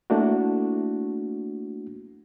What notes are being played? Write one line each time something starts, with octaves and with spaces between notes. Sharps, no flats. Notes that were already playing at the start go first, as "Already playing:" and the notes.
A3 A#3 D4 E4 F#4